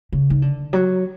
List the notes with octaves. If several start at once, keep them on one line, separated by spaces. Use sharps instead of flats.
C#3
D#3
D3
F#3